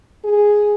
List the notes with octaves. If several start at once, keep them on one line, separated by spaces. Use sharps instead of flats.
G#4